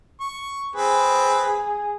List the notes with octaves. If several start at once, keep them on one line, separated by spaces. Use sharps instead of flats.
C#6
C4 G#4 B4